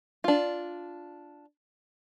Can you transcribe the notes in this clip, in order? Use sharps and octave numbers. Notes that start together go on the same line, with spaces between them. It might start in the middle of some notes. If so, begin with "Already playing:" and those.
D4 F4